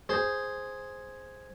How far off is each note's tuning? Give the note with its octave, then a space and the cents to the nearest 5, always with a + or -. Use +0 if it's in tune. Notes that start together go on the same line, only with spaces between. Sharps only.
G#4 +0 C5 +0